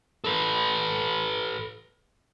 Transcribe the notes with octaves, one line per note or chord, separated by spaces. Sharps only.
A4 B4